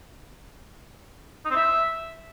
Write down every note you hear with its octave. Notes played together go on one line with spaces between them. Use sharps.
D#4
C4
E5